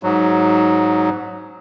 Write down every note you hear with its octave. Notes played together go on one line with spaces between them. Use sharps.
G#2 F#3